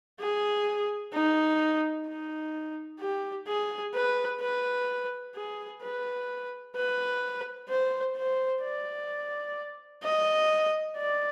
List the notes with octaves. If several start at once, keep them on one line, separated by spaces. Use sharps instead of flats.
G#4
D#4
D#4
G4
G#4
B4
B4
G#4
B4
B4
C5
C5
D5
D#5
D5